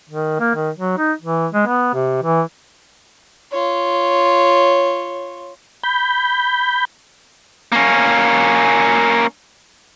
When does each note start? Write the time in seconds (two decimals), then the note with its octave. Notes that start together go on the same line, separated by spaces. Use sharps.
0.10 D#3
0.40 A#3
0.55 D#3
0.78 F#3
0.98 D#4
1.22 E3
1.53 G#3
1.67 B3
1.94 C3
2.23 E3
3.52 F4 C#5
5.83 B5 G6
7.72 A#3 C#4